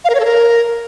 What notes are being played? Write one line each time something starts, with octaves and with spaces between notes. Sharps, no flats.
F5
A#4
C#5
A4
A#4